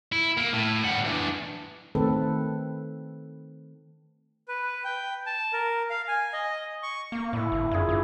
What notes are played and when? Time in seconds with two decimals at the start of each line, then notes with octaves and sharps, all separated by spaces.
0.12 E4
0.37 A#3
0.53 A2
0.84 G3 F#5
1.05 E3 D4
1.95 D#3 A3 C4 A4 B4
4.48 B4
4.84 G5
5.26 A5
5.53 A#4
5.90 F5
6.08 G#5
6.33 D#5
6.83 C#6
7.12 A#3
7.33 A2 E4
7.52 G1
7.72 F#2 E4 F4 G#4
7.89 G2